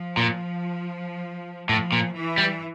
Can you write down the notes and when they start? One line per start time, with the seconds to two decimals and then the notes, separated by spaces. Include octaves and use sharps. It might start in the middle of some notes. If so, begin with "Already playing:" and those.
Already playing: F3
0.17 A#2
1.69 A2 F3
1.92 A#2
2.14 E3
2.37 G3